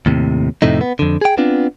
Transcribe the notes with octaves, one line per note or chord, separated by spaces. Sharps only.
D#2 A2 C3
F2 A2 C3 A3 D#4
B3
F2 D3
G#4 G5
B3 C4 D4 F4